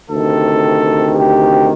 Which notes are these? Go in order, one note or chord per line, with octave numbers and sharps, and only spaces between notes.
D2 C3 D#3 A4
G4